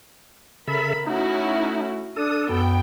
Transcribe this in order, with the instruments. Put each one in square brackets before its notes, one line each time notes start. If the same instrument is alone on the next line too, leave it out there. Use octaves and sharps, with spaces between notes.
[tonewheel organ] C#3 A4 E5 [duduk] A#4 [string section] B5
[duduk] A3 [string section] C#4 E4 F#4 [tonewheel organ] D#4
[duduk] D4 [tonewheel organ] A4 [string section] D#6
[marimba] F#2 [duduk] B3 [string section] G5